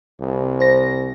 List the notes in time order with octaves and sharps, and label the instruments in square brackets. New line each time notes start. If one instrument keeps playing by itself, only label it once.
[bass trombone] C2
[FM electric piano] C5 A#6